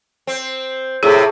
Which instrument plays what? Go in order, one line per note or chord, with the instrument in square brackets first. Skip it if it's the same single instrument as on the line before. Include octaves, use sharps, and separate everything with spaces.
[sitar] C4
[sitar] A2 C3 [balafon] G#4